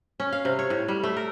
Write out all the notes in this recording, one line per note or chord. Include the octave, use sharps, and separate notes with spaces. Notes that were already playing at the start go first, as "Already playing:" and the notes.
C#4
F5
C3
C#5
A2
G3
A3
A#4